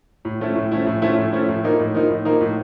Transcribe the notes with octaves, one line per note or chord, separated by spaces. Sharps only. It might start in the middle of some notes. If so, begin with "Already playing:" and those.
A2
F3 A3 C#4 E4
A2
F3 A3 C#4 E4
A2
F3 A3 C#4 E4
A2
F3 A3 C#4 E4
A2
F3 A#3 D#4
A2
F3 A#3 D#4
A2
F3 A#3 D#4
A2